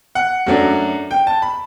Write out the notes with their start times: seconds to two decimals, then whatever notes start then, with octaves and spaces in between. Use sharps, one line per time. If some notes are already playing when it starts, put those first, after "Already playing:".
0.15 F#5
0.47 F#2 F#3 A3 D4
1.11 G5
1.27 A5
1.42 B5